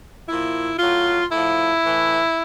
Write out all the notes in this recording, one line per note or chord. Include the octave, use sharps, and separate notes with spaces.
A#2 F3 E4
A2 F#3 F4
A2 F3 E4
A2 E3